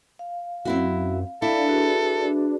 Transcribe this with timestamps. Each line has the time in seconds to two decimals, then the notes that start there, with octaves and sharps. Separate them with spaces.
0.19 F5
0.65 F#2 C4 E4 F#4
1.42 D4 E4 A4 D5 F5
1.67 F#4 G#4 B4